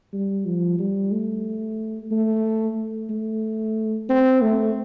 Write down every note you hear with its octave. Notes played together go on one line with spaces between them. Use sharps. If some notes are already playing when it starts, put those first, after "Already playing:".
G3
F3
G3
A3
A3
A3
C4
A3